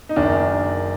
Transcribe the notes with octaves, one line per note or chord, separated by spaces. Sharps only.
D#4
F#1 F#2 D#3 D4